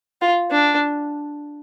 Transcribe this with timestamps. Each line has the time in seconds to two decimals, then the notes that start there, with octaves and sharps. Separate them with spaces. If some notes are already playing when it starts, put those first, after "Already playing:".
0.21 F4
0.50 D4